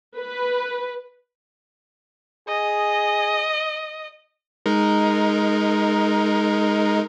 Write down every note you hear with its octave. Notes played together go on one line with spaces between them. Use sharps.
B4
G#4 D#5
G#3 D#4 A#4